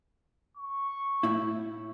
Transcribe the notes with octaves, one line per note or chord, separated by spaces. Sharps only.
C#6
A2 E4